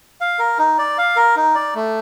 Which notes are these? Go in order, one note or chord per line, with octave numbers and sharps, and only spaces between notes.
F5
A#4
D#4
D5
F5
A#4
D#4
D5
A3